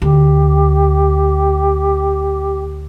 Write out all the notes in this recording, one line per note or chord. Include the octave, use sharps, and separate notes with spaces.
D2 G4